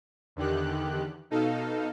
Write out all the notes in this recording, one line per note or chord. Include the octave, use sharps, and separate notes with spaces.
E2 D3 D#3 G4 F#6
B2 D#4 A4 F5